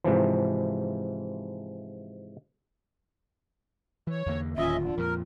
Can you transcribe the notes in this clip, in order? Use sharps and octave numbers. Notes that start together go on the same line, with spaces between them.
G#2 C3 E3 F3
E3 C#5
E2 D3 A#3
D1 D#2 C#4 F4 D#5 E5
D3
F2 A#2 A#4